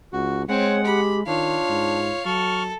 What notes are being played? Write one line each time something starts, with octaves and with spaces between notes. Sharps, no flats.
C#2 F#4
G#3 C4 C#5 F#5
G4 B5
D#3 D4 F4 C#5 F5
G#2
F#3 A4 C#6 F6